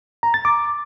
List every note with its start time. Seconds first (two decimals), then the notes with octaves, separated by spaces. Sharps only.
0.23 A#5
0.34 A6
0.45 D6